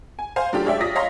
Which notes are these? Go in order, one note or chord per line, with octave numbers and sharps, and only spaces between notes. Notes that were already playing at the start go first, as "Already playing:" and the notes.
G#5
C5 F5 G#5 C6
F#3 A3 D4 F4 G4
G#3 C#5 D5 E5 G5
F4 D5 D#6 A#6 B6
C#5 D#5 F5 A#5 C6 A#6